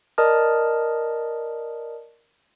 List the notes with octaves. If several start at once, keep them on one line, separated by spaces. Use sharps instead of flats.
A#4 D5 D#5 A5 D#6 F6